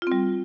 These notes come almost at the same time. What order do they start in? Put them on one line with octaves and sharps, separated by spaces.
F4 C4 G3